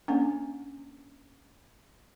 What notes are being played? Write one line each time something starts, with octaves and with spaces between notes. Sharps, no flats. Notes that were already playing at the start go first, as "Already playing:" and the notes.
A#3 C#4 D4